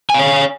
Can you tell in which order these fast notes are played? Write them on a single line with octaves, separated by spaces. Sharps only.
G#5 F5 C#5